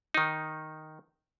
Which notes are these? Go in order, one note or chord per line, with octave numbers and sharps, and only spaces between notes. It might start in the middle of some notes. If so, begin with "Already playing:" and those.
D#3 D#4